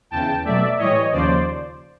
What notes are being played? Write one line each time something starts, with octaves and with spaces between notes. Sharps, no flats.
E2 C#3 E3 G5 A5
B2 F#3 A3 D5 E5
A2 E3 G3 C#5 D#5
D#2 C#3 F3 C5 D5